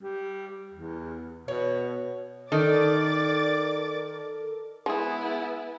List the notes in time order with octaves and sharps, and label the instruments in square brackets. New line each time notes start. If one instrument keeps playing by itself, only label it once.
[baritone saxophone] G3
E2
[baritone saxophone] B2 [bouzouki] C#5 F#5
[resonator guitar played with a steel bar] D#3 [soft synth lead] A4 [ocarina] A#4 [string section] D5 D6 A6
[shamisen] G#3 G#4 [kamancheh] B3 E4